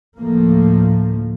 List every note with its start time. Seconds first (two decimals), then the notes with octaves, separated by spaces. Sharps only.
0.18 D2 A2 F3 A3 A#3